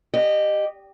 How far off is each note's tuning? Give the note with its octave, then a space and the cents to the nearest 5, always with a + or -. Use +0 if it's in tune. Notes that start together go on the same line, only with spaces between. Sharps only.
G4 +0 D#5 -20